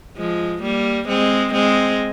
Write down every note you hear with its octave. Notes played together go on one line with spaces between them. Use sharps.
F3 G#3
G3 A#3
G#3 C4
G#3 C4